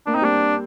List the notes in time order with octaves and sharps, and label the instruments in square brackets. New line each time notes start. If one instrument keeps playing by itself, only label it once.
[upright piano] A#3 [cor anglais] D4
[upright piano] C4 [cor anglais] D#4
[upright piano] G3 A#3 [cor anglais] D4